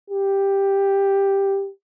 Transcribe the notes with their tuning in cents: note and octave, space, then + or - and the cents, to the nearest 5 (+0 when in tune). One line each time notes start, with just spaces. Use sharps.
G4 +5